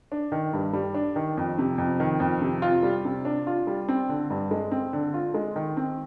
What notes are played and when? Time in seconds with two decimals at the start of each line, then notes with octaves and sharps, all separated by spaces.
0.12 D4
0.32 D#3
0.53 G2
0.73 G3
0.94 D4
1.16 D#3
1.37 F2
1.58 C3
1.78 F2
2.00 D#3
2.20 F2
2.41 C3
2.62 F4
2.83 G3
3.05 C3
3.25 D4
3.47 F4
3.67 G3
3.89 C4
4.09 D3
4.30 G2
4.51 G#3
4.72 C4
4.93 D3
5.14 F4
5.34 G#3
5.56 D#3
5.77 C4